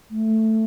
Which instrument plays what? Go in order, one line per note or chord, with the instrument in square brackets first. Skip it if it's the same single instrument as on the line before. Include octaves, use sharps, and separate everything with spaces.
[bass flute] A3